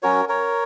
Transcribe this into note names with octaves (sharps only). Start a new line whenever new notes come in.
F#3 C#4 F#4 A#4 C#5
A#4 C#5